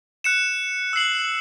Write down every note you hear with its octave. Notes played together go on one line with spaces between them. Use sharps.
F#6 C#7 E7
E6 C7 F#7